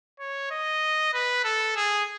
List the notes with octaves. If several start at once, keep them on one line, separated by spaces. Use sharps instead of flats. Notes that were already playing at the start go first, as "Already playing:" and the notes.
C#5
D#5
B4
A4
G#4